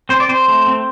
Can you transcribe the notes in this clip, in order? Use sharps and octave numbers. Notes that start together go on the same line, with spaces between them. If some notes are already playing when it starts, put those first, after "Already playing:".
C4 C5
D5
C4 C5
A3
C4